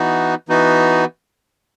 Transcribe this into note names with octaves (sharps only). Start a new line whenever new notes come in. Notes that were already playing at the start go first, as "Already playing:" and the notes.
Already playing: E3 B3 D#4 F#4
E3 B3 D#4 F#4